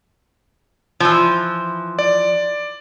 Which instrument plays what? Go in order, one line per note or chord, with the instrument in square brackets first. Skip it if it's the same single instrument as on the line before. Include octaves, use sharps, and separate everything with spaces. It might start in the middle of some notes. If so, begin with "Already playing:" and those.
[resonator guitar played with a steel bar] E3 F3
[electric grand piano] D5